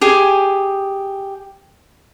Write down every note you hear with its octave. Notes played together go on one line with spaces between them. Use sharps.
G4 G#4 G#5